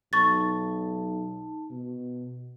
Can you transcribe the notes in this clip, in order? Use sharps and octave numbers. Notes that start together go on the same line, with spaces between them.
B1 D#4 A5 C#6 A6
B2